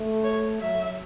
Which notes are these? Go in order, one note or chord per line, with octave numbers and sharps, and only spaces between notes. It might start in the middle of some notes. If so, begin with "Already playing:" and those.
Already playing: A3
C#5
F#3 E5